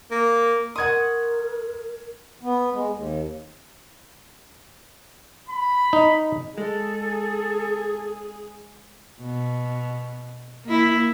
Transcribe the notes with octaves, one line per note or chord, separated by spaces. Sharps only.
A#3
A#4 F#5 C6 C#6 D#6 G#6
B3
G#3
D#2
B5
D#4
G#3 G#4 A4
B2
A#3 E4